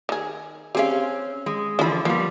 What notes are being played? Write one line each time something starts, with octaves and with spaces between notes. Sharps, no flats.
D#3 G#4
C4 C#4 G4 G#4 F5
G#3
D3 E3 F3 C#4 B5
F3 G3 A#3 B3